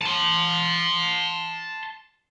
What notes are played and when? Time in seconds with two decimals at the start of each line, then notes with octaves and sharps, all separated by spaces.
0.01 A5 C6